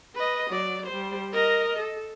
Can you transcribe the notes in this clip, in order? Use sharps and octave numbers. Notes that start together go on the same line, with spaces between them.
B4 D#5
F#3 D5
G3 C5
A#4 D#5
A4